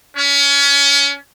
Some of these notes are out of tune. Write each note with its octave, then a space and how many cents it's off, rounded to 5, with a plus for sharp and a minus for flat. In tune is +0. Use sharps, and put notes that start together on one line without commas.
C#4 +30